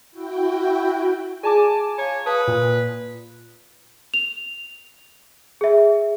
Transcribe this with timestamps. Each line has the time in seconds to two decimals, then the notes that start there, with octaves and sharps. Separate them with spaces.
0.11 E4 F#4 G5
1.43 F4 G#4 D5 G#5 A5 D6
1.98 C#5 F5 A#5
2.26 B4 F5 A5 D#6
2.47 A#2
4.14 F7
5.61 G#4 E5